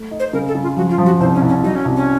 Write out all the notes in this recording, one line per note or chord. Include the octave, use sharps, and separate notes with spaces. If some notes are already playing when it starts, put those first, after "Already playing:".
Already playing: A3
D#4
C5
C#3 A#4
A4
C#3
F4
F3 F#4
F4
F3
F#4
C2 C5
C#4
C2
C#4
F#3 D#4
C#4
C2
C#4